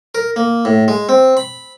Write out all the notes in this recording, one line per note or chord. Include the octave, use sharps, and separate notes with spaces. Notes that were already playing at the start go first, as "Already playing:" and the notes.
A#4
A#3
A2
G#3
C4
B5